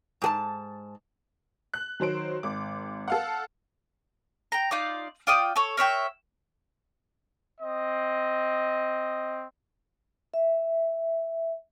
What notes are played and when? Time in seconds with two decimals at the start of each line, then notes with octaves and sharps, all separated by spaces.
0.22 G#2 G#4 A5
1.74 F#6
2.00 D#3 F#3 C5 D7
2.43 G#1 D6
3.08 A4 F5 F#5
4.52 G5 A#5
4.71 D#4 F4 D5
5.27 F4 D5 G5 D#6
5.56 A4 C#5
5.77 A#4 C#5 E5 G5
7.60 C4 D#5
10.34 E5